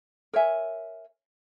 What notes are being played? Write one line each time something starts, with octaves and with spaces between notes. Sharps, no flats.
A#4 C#5 E5 G#5